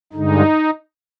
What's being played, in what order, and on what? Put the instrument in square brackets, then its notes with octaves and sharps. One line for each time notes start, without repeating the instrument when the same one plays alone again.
[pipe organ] G2 D3 G#3 D#4